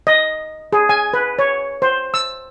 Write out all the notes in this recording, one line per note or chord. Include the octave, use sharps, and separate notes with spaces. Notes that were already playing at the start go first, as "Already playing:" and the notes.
D#5
G#4
G#5
B4
C#5
C5
E6